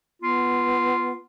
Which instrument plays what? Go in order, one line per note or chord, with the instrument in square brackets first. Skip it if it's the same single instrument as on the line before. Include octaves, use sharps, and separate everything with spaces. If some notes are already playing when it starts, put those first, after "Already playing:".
[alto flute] B3 [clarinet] F4